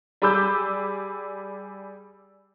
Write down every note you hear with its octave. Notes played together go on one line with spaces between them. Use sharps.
G3 G#4 B5 D6 E6 G6